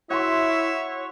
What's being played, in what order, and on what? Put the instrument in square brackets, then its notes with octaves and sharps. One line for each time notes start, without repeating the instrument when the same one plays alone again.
[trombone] E4 [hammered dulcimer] F#4 C6 [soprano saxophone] C#5 [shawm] E5